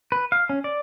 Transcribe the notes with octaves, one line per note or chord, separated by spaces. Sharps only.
B4
F5
C#4
D5